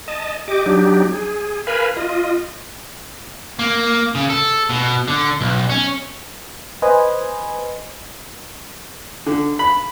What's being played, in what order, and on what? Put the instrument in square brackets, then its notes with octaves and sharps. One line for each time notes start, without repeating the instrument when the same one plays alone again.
[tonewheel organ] D#5 A5
G4 D#5 D6
F#3 D4 D#4 G4
G#4
A#4 B4 F5 G#5 B5
F4 D#5
[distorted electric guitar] A#3
C#3
A4
B2
D3
B1
C#4
[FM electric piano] B4 C5 D#5 G#5
[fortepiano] D3
B5